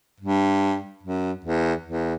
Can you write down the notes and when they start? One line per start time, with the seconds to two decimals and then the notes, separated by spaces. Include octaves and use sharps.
0.20 G2
1.03 F#2
1.45 E2
1.85 E2